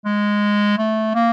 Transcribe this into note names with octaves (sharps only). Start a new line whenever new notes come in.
G#3
A3
A#3